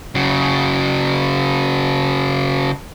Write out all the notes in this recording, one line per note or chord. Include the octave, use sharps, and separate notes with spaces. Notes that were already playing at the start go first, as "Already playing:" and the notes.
C#3 F#3